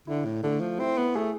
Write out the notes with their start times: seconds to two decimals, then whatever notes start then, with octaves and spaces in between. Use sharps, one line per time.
0.07 D3 E4
0.25 A2
0.43 D3 A3
0.60 F3
0.79 C4 E4
0.97 B3
1.15 A3 G#4